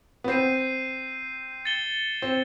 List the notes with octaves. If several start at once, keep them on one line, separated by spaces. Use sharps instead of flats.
B3
C4 G6 C7 D#7
A6 C#7 E7 G7
C4